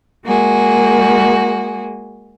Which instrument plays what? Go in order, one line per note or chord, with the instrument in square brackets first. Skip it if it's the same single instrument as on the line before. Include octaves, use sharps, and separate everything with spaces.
[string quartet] G#3 A#3 F#4 G#4